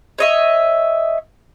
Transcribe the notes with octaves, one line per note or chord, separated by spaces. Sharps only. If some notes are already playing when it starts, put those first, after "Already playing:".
C#5 D#5 E5